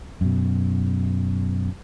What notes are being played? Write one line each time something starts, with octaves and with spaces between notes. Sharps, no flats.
F#2 B2